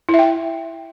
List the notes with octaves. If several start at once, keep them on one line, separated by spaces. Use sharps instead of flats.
E4
E5
G5